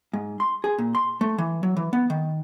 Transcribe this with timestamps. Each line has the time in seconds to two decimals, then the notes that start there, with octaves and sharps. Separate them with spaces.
0.13 G#2
0.40 C6
0.64 G#4
0.79 A#2
0.95 C6
1.21 A3
1.38 E3
1.63 F#3
1.77 E3
1.93 B3
2.10 D#3